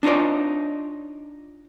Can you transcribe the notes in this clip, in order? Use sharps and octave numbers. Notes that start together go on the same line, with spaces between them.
D4 D#4 F4 C#5 D5